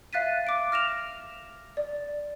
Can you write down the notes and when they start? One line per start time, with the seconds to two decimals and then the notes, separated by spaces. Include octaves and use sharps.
0.13 E5 F5 F#6 A6 B6 D#7
0.47 D6 D7
0.72 F6 A#6 E7 F7
1.77 D5